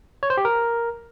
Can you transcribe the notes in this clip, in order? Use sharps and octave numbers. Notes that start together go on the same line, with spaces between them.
C#5
C5
G4
A#4